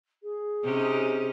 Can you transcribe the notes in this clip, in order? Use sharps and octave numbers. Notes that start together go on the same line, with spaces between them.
G#4
C3 C#4 D#4